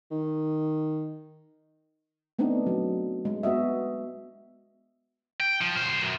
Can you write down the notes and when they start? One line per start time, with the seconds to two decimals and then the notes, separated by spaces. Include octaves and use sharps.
0.11 D#3
2.39 A3 B3 C4 D4 D#4
2.66 F#3
3.25 G#3
3.43 B3 F#4 D#5 E5
5.40 G5
5.61 F3
5.75 B1 C5
6.02 F#2